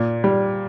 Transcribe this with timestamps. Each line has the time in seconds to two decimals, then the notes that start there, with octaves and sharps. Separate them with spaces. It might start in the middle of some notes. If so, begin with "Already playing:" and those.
Already playing: A#2
0.24 G3